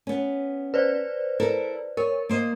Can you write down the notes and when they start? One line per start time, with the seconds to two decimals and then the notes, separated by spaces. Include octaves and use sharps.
0.07 B3 C#4
0.74 B4 C5 D5
1.40 E4 A4 A#4
1.97 A#4 C#5
2.29 A#3 C5 D#5